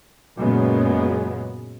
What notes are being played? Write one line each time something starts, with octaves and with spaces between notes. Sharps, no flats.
F#2 A#2 C#3 G#3 B3